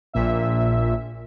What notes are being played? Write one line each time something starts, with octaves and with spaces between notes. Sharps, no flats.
A#1 A#2 E5